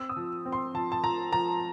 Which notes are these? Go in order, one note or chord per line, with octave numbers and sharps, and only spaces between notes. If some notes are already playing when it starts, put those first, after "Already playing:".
Already playing: C4 E6
D#6
F3
C4
C6
F3 A5
A5
F3 A#5
F3 A#5